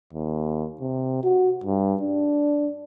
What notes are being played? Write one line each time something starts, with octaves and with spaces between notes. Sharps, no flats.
D#2
C3
F#4
G2
D4